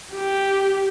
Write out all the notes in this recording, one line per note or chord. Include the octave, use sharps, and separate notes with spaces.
G4